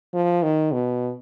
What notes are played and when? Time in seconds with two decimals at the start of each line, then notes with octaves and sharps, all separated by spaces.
0.14 F3
0.43 D#3
0.72 B2